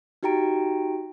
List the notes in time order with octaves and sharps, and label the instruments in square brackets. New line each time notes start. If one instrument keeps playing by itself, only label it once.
[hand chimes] D#4 F#4 G4 G5 A#5 D7